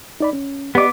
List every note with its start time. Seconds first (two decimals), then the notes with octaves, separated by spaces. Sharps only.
0.20 D#4 D5 B5
0.33 C#4
0.75 B3 G4 D5 D#5 D6